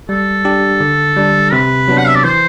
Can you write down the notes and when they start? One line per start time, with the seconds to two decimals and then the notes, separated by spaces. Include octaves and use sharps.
0.09 G3 A4
0.45 D4 G4
0.80 D3
1.17 G3 D4
1.52 C3 B4
1.88 F#3 B3 D4
1.98 F#5
2.07 E5
2.15 D5
2.24 E3 C5